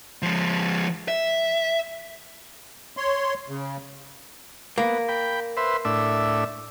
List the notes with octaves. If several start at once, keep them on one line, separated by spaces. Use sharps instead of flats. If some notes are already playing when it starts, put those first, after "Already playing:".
F3 G#3
E5
C#5 C6
C#3
A#3 B3
G5 B5
B4 C5 E5
A2 D4 E5